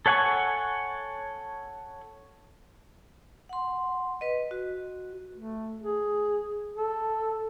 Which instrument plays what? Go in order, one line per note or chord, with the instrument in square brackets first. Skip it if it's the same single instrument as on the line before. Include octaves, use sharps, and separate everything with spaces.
[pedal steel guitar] A4 C#5 F#5 G#5 C#6
[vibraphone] F#5 C6
B4 D#5
F#4
[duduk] A3
G#4
A4